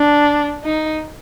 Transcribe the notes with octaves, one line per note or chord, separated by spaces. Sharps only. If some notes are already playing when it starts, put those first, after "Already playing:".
Already playing: D4
D#4